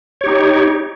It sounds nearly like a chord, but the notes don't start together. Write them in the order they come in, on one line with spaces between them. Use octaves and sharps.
C#5 G4 D#4